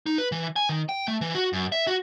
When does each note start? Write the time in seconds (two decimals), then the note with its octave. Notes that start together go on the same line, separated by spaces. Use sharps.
0.06 D#4
0.18 B4
0.32 E3
0.56 G#5
0.69 D#3
0.89 G5
1.08 A3
1.21 E3
1.35 F#4
1.53 F#2
1.72 E5
1.87 F#4